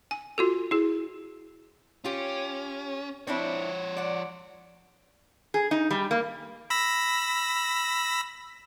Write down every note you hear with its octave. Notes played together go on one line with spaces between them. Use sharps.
G#5
F4 F#4 A4
E4 G#4
C#4 F4 G4
F3 C4 D4 E4 C#5
D5 F#5
G#4
D#4
G3
A#3
B5 E6 A#6